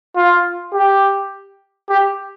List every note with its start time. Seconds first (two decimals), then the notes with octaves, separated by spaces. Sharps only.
0.16 F4
0.73 G4
1.89 G4